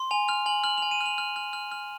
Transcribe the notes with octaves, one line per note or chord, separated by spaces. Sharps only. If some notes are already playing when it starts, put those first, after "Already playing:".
Already playing: C6
G#5 F7
F6 F7
G#5 F#7
F6 F#7
G#5 F7
D#7
F6
F7
F6
F6
F6
F6